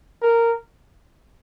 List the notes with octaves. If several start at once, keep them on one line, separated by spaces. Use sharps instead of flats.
A#4